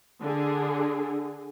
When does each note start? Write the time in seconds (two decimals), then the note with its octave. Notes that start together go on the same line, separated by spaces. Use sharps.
0.21 D3 G#4